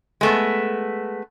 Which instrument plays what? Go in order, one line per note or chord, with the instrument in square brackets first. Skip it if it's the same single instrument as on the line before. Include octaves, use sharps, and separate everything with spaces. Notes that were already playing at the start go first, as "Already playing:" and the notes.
[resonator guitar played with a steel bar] G#3 A3 B3